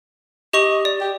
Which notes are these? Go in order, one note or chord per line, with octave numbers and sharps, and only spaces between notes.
G4 D#5 C#6 F7
D5
G4